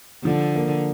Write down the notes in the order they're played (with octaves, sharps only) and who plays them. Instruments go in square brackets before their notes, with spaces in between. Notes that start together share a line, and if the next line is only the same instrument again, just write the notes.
[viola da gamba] D3 [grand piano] F3
[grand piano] A#3